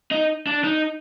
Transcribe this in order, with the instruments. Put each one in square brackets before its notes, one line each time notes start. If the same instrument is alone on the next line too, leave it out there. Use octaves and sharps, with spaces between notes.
[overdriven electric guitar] D#4
D4
D#4